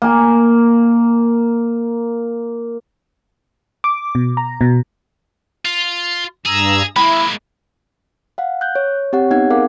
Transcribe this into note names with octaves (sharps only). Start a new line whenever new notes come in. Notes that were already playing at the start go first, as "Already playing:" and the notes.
A#3 G#5
D6
B2
A#5
B2
F4
G2 G#4 A#5 E6
G#3 A#3 E4 B5
F5 F#5
F#6 G6
C#5
C4 G4 C#5 F#5
B3 C4 D#4 F#5 G#6
G#4 A#4 F5 F#5 D6